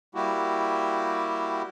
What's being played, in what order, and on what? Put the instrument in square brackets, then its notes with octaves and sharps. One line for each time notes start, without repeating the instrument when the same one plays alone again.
[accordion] G3 A#3 E4 F#4 G4